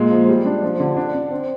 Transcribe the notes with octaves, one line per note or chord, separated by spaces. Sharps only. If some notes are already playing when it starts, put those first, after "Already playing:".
Already playing: A#2 G#3
F3
G3
D4
F3
D3
D4
D4
C4